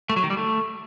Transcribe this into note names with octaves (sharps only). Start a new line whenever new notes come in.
A3
F#3
D#3
G3
A3